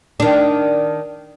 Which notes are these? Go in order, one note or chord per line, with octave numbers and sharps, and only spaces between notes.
D#3 D4